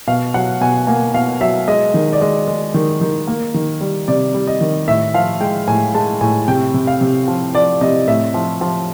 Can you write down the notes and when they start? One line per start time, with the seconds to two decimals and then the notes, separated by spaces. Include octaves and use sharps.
0.08 B2 F5
0.34 F#3 F#5
0.61 B2 G#5
0.87 A#3 G#5
1.14 B2 F5
1.41 F#3 E5
1.68 G#3 D#5
1.94 D#3
2.13 D5
2.21 G#3 D#5
2.48 G#3
2.74 D#3
3.01 D#3
3.27 A#3
3.54 D#3
3.81 G3
4.08 C3 D5
4.34 G3
4.48 D#5
4.61 D#3
4.88 A2 E5
5.14 F3 F5
5.41 G#3 G5
5.68 A2 G#5
5.94 G#3 A5
6.21 A2 G#5
6.48 C3 G5
6.74 C3
6.87 F5
7.01 C3
7.28 F3
7.55 F3 D5
7.81 C3 D#5
8.08 A2 E5
8.34 F3
8.61 F3